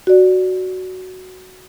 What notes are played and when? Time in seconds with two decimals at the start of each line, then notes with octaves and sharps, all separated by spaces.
0.07 F#4 D5